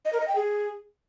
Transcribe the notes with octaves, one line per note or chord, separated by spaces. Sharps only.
D#5
A#4
D#5
G5
G#4